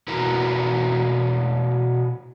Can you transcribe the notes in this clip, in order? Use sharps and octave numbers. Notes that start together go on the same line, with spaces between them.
B2 E4 F#4 A#4 B4